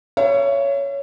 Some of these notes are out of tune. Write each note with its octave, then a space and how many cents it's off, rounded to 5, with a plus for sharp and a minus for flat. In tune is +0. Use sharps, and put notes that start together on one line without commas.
C#5 +10 E5 +40